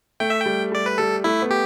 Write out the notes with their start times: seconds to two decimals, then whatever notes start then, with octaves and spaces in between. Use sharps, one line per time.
0.20 A3 G5
0.30 E5
0.41 G3 G5
0.72 G3 D5
0.86 B4
0.98 G3 A4
1.24 A3 E4
1.42 B3
1.50 G4